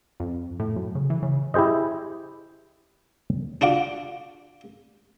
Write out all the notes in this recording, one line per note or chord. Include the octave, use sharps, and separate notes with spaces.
F2
A2
F#2
C#3
E3
C#3
E4 G4 G#4 C5 D#5
D4 F4 F#4 D6